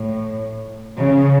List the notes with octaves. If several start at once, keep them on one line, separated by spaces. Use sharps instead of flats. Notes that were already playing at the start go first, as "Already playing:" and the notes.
Already playing: A2
C#3